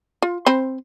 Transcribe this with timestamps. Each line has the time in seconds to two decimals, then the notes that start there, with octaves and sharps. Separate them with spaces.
0.22 F4
0.46 C4 C5 B5